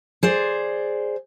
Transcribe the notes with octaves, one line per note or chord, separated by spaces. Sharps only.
G#4 C5 D5